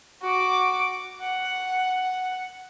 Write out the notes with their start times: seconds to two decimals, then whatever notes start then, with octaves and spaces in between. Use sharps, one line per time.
0.22 F#4 D6
1.21 F#5